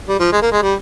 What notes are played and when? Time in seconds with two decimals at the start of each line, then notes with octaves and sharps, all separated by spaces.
0.09 G3
0.19 F3
0.32 G#3
0.42 A#3
0.52 G#3
0.63 G3